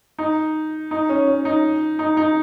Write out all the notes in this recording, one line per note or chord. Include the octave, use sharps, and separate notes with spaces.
D#4
D#4
C#4
C#4
D#4
D#4
D#4